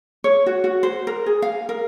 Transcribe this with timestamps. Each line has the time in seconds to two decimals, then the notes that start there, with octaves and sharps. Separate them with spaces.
0.24 C#5
0.46 F#4
0.64 F#4
0.83 C5
1.07 A#4
1.26 G#4
1.42 F5
1.69 A#4